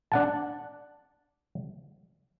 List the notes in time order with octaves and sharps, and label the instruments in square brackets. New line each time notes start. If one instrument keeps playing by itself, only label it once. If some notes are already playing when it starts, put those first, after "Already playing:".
[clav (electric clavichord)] D4 F#5 A5